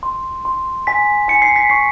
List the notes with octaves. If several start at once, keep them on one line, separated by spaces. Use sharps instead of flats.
C6
C6
G#5 B6
G#5 C#7
C7
B6
C#6 C7